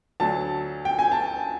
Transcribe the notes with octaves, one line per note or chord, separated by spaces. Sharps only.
D2 D3 F#3 A5
G5
G#5
A5